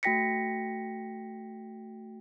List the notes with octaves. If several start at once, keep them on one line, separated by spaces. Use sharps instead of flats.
A3 F#4 G5 A#6 B6 C#7